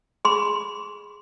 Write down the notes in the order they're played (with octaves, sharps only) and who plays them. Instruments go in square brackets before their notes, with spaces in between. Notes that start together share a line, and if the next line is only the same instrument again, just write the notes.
[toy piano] G#4 B5 C6